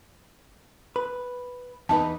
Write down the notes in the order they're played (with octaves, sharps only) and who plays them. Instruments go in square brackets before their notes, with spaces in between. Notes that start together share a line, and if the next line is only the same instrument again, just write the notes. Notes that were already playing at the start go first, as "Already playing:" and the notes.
[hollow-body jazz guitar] B4
[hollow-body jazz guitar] E2 D#4 B4 [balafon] A5